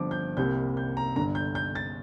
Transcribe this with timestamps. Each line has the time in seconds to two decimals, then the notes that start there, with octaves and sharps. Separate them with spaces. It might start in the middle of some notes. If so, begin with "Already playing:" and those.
Already playing: G1 G2 F3 C4 D6
0.11 G6
0.37 C2 C3 G3 A#3 G6
0.77 G6
0.97 A#5
1.16 G1 G2 D3 A#5
1.35 G6
1.55 G6
1.75 A6